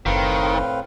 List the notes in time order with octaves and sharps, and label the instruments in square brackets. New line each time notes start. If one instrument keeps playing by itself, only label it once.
[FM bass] F#1 [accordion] A2 C4 [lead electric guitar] D#3 [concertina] B4 F5